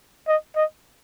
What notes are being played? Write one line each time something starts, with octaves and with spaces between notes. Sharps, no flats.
D#5
D#5